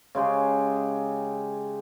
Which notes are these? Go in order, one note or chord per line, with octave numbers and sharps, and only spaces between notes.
C#3 G#3 G4 G#4